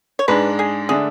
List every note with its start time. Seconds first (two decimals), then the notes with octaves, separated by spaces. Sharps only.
0.19 C#5
0.28 G#2 G#3 D4 B4
0.59 G#4
0.89 D3 A3 D4 G#4